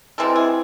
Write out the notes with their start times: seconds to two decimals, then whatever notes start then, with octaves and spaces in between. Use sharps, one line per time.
0.18 C3 E3 G#3 C4 A4
0.36 G#4